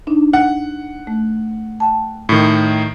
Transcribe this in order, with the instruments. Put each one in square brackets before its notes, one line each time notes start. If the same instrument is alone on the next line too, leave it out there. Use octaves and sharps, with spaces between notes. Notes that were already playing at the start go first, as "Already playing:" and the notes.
[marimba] D4 D#4
[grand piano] F#5
[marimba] A3
G5 A5
[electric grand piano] A2 D#3